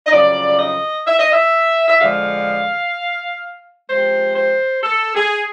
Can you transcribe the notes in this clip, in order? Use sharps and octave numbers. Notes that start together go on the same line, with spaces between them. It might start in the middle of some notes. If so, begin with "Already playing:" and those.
D#5
F2 C#3 F#3 D5
D#5
E5
D#5
E5
E5
F2 D3 F3 G#3 F5
C3 F3 G#3 C5
C5
A4
G#4